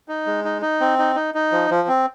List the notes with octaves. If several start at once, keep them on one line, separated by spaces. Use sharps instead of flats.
D#4
G#3
D#4
D#4
C4
D#4
D#4
D#4
F3
F3
C4